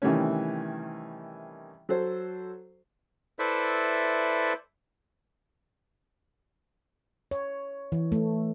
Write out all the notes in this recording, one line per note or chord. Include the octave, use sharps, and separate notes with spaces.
C3 D#3 E3 G3 A3 C#4
F#3 A4 C5
E4 A4 B4 C5 D5 E5
C#5
E3
A3